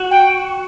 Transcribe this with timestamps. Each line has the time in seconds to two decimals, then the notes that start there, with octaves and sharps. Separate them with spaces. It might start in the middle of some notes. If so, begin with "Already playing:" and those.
Already playing: F#4
0.10 G5